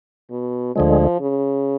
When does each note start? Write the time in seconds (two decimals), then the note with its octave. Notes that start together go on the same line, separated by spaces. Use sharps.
0.31 B2
0.75 D2 D3 F3 G#3
1.20 C#3